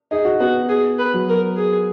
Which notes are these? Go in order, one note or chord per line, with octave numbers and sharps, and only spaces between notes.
D#4 G#4
F#4
B3 F#4
G#4
B4
F#3
A#4
G#4